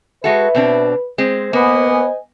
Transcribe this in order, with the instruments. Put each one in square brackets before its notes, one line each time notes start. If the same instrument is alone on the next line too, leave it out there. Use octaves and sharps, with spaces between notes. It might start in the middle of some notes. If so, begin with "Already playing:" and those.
[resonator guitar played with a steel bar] G#3 F#4 A4 [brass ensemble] B4 [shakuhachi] E5
[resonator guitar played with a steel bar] B2 C4 D4
[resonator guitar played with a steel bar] G#3 C4 [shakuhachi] C5
[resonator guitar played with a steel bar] A#3 [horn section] B3 [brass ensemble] D#5 G#5